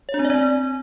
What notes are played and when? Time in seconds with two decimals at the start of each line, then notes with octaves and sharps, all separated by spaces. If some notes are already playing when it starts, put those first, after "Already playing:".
0.09 C#5
0.14 D4
0.19 C4
0.25 D5
0.30 C4